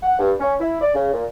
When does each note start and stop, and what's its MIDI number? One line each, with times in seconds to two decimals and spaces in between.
0.02 0.15 78
0.19 0.32 43
0.40 0.54 61
0.60 0.80 64
0.81 0.91 74
0.94 1.10 49
1.13 1.24 46